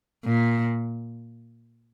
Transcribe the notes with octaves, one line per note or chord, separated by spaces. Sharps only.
A#2